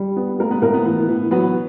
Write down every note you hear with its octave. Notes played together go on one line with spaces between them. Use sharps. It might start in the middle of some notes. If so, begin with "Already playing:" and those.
Already playing: G3
B3
A3 A#3 A#4
B3 B4
A2 A#3 A#4
B3 B4
E3
E3
F#3 B3 B4